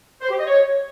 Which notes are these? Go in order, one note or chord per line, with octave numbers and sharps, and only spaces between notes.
C5
G4
D#5
C#5